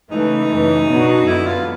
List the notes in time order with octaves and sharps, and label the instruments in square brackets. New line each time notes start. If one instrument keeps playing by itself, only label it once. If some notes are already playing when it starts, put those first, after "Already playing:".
[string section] C#3 E3 A3 [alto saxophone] D#4
[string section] F#2 C#3 E3 A3
B2 F#3 B3 D4 F#4
[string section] F#2 D3 F#3 B3 [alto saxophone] E4
[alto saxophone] F4